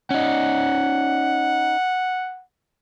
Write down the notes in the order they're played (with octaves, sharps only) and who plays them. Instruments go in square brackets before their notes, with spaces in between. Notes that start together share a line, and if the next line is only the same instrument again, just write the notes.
[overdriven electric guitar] C#4 D#4 [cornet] F#5